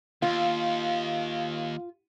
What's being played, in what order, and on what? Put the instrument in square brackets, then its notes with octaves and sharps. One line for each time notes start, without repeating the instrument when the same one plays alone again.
[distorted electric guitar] D#2 [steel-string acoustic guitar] F4 [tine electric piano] F5